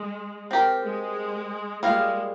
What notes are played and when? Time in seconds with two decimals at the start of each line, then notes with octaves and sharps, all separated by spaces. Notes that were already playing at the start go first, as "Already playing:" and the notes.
Already playing: G#3
0.51 C4 G4 A#4
0.84 G#3
1.83 G3 G#3 A#3 F4 C5 F5